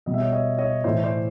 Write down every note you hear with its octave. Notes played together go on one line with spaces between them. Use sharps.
B2 G3 D#5
E5
C#5 D#5
C#5 D#5
C#5 D#5
A2 E3 A3 C5 D5
C5 D5